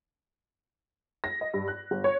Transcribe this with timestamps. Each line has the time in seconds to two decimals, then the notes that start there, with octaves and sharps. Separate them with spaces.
1.24 A#6
1.41 D#5
1.54 G2
1.68 F#6
1.91 G1
2.04 C#5